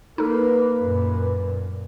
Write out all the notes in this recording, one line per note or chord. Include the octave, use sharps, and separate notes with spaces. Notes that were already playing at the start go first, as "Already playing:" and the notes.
A#3 D#4 A4 B4
F#2 A#2